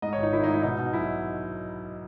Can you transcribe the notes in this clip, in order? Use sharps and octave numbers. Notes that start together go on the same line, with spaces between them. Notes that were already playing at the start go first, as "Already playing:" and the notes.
G#2 D#5
G#1 C#5
D#4
D#3 E4
G#2 D#4
E4
B2 D#4
B2
B1 E4